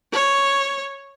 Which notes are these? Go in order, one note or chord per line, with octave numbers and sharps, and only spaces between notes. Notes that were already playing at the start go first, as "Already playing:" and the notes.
C#5